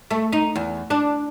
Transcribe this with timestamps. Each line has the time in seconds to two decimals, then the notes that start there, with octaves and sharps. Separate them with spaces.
0.11 A3
0.33 D#4
0.56 E2
0.90 D4